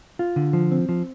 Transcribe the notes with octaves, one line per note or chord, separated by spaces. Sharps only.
F4
D3
F3
C4
F3